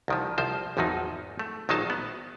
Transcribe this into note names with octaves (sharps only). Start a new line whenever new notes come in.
C2 D#3 F3
C2 F3 C5
G#1 E2 F3 F#3 D#4
A3
A#1 D#3 F#3 D#4 C5 A5
B3